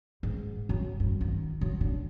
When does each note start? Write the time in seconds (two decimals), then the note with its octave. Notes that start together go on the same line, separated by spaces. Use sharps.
0.23 G#2
0.69 F#2
1.00 G2
1.21 D#3
1.61 F#2
1.81 D3